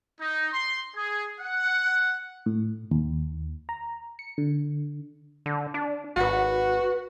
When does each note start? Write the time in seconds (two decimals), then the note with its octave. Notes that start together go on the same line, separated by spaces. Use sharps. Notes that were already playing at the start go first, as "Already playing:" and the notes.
0.21 D#4
0.53 C6
0.96 G#4
1.40 F#5
2.46 A2
2.91 D#2
3.69 A#5
4.19 C#7
4.38 D3
5.46 D3
5.74 D4
6.16 G#1 F#4 B4 F#5